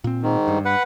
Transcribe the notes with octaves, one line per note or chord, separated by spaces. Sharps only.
A#2 C4
G#2 D#3
G2
B4 F#5